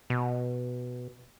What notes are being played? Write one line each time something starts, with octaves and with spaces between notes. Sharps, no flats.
B2